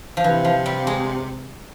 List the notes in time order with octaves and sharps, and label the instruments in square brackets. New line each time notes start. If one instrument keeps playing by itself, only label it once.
[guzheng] F3
[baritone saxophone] C3 [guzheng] E3
[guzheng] F3
G3
G#3